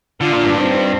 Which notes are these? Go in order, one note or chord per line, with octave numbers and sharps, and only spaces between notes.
D3 D4 F4
A#2
G2
C4 D#4